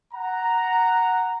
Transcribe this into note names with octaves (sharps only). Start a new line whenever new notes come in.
F#5 A#5